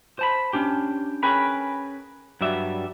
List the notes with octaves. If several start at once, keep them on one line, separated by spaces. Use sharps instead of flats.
C5 A5 B5
C#4 D4 G4
C#4 G#4 A#4 B4 G5 B5
G2 F#3 G3 D5 E5